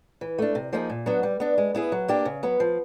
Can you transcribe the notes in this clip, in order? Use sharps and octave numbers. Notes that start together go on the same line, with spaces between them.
E3
A3 D4
C3
F3 A#3 D#4 G#4
A#2
F#3 B3 D4
G3
B3 D4
G#3
B3 E4 G#4
F#3
A#3 D4 G4
C#3
F#3 B3
F3